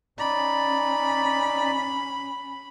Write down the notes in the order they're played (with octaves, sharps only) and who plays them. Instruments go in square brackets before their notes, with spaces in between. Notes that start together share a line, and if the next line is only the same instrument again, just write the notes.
[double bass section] C#4 [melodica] D#4 D5 [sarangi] B5